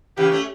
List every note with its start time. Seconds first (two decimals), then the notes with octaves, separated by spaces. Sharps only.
0.17 C#3 E3 G4
0.32 A3 C#4